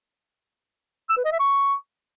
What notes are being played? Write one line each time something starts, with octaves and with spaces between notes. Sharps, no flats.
E6
B4
D#5
E5
C#6